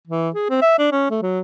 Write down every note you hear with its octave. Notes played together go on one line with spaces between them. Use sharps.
E3
G#4
C4
E5
D4
C#4
A3
F#3